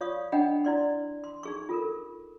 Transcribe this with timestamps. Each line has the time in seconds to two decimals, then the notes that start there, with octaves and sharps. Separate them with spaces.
0.01 F4 C#5 D5 F5 C#6 D#6
0.32 D4 D#5 F#5 G5 B5
0.65 E4 D5 C6
1.24 C6
1.43 D#4 G#4 C#6
1.69 F4 A4 A#4